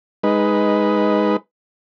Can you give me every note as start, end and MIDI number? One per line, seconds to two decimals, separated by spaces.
0.24 1.36 56
0.24 1.36 63
0.24 1.36 71